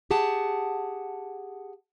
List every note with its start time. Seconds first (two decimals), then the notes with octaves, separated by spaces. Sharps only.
0.11 G4 G#4 F#5 A5